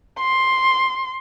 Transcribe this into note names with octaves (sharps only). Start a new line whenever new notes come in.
C6